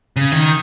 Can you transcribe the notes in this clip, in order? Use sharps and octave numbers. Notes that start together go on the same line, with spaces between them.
C#3
D#3